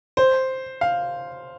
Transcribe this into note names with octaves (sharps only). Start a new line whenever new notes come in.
C5
F5